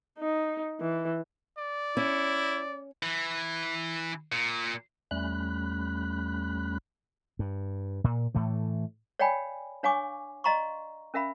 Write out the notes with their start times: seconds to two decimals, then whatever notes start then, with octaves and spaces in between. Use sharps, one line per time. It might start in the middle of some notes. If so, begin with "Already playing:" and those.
0.19 D#4
0.80 E3
1.58 D5
1.97 C#4 E4
3.03 E3
4.32 A#2
5.11 E2 G3 A3 C#4 B5 F#6
7.39 G2
8.04 A#2
8.35 A2 E3 A3
9.19 C#5 D5 F5 G5 G#5 B5
9.83 D4 C#5 F5 G#5 C#6 D6
10.44 D5 D#5 F5 A#5 C6 C#6
11.14 C#4 A#4 E5 F5 B5